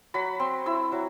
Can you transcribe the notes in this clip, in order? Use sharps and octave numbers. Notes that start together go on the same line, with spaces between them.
F#3 B5
C4 C6
E4 E6
F#3